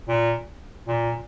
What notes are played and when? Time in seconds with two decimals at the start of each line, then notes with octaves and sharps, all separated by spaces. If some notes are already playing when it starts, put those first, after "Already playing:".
0.08 A#2
0.87 A#2